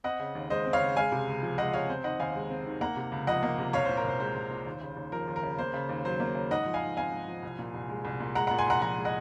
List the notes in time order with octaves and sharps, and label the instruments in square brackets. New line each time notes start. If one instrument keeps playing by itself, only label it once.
[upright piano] C4 D#5 F#5
C#3
D#2
G#3 C5 D#5
C4
C#5 F5
C#3
G#3 F5 G#5
C3
C#2
F3
G#3 D#5 F#5
C3 C#5 F5
C4 C5
D#3 D#5 F#5
D#2 F5 G#5
G#3
C4
D#3
A#3 F#5 A#5
C3
C#2
F3 D#5 F#5
A#3
C3
C2 C#5 F5
A#2 C5
A#4
C2 C5
G#3 C5
C2
A#2
D#2
C#3
D#2
F3 A#4
D#2
A#4
C#3
A#3 C5
C#3
D#2
F#3 C5
A#3
C#3
G#2 D#5 F#5
F3
F5 G#5
G#2
C4 F5 G#5
G#2
F3
C2
A#2
C2
G#3
C2
A#2
G#3 F#5 A#5
A#2 F#5 A#5
G#5 C6
C2 F#5 A#5
F3 F#5 A#5
G#3
D#5 F#5